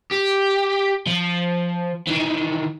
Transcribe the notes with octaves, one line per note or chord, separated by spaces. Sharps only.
G4
F3
D#3 E3